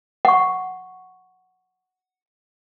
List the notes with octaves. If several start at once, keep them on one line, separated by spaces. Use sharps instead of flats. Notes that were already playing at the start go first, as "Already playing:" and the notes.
F#5 C#6